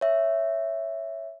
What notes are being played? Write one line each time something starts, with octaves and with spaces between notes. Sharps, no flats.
C#5 E5